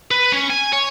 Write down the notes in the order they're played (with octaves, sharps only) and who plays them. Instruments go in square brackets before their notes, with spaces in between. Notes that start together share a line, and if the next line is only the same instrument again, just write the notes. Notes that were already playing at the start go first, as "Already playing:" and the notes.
[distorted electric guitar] B4
C#4
G#5
C#5